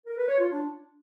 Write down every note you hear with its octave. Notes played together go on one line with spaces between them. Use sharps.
A#4
B4
C#5
F4
D4